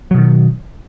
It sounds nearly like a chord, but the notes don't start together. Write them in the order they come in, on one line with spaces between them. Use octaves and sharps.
F#3 B2 D#3